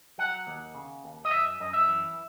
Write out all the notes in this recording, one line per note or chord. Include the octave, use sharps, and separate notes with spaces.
F#3 F#5
D#2
C#3
D#2
D#5
F#2 E5
F#2 D#5
E5
E3